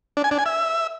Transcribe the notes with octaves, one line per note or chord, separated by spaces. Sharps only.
D4
G#5
D4
G#5
E5